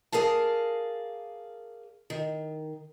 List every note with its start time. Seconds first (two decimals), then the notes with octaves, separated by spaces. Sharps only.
0.12 G#4 A#4 D5 F5 A5
2.10 D#3